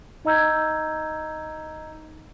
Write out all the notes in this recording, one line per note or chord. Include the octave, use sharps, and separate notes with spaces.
D#4 D#5 A#5 E6 G6 G#6